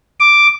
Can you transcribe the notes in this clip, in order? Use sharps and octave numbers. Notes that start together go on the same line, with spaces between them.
D6